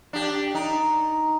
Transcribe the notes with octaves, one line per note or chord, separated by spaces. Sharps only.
D4 G4
D#4